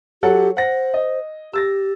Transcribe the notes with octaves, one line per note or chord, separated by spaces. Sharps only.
F#3 G4 A4 F#5
C5 F#5 A#6
D#5
G4 E6 A6 A#6